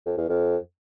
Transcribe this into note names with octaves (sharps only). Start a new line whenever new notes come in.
F2
E2
F2